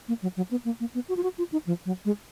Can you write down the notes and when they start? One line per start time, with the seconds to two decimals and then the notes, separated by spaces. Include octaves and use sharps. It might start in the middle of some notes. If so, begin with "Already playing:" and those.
0.08 A#3
0.22 F#3
0.37 F#3
0.51 B3
0.65 A#3
0.80 A#3
0.95 B3
1.09 F#4
1.17 F4
1.23 F#4
1.38 F4
1.52 D#4
1.67 F3
1.85 F#3
2.05 G#3